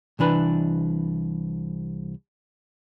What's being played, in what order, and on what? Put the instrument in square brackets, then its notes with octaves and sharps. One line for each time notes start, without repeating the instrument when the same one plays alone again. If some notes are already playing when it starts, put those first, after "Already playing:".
[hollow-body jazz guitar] C2 E3 D4 B4